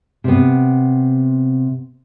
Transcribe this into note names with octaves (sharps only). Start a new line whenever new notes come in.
C3 B3